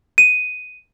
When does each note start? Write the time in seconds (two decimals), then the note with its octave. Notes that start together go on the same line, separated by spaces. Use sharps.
0.18 D#7